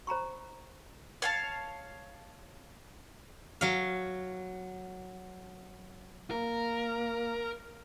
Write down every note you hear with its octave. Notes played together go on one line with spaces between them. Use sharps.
C5 A#5 B5 C#6
C#5 F5 A5
F#3 F5
A#3 A#4